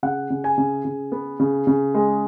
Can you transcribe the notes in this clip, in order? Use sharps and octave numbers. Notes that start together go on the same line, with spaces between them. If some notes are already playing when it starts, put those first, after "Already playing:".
C#3 F#5
C#3
G#5
C#3
C#3
B3
C#3
C#3
G#3